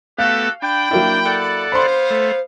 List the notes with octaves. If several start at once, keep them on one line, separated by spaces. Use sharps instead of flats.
A3 B3 F#4 G4 A4 F5 F#6
D4 G5 B5
F#3 A#3 D4 E4
A4 D5 F#5
B3 C5 F5 B5 C6
A3